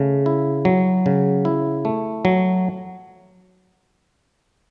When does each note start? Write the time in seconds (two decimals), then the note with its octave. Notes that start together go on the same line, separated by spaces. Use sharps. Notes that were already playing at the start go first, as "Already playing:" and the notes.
Already playing: C#3 A3
0.26 E4
0.65 F#3
1.06 C#3
1.45 E4
1.85 A3
2.25 F#3